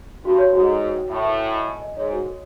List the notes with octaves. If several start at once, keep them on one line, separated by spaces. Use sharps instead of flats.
G2 F#4
C#5
G#2 F#4
A4
B4
G5
A2 E5
B4
G#5
D#5
G#5
D#5
G#2 C#5
F#4
A4